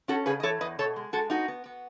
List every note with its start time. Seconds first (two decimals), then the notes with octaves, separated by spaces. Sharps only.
0.08 C#4 F#4 A4
0.26 C#3 G#4 B4
0.40 D#5
0.43 E3 A4 C#5
0.61 E2 B4 D#5
0.79 B2 A4 C#5
0.96 G#3
1.13 G#3 F#4 A4
1.30 B3 D#4 F#4
1.48 B3
1.66 B3